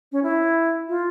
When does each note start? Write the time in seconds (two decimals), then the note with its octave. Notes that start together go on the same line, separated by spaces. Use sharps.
0.12 C#4
0.23 E4
0.89 F4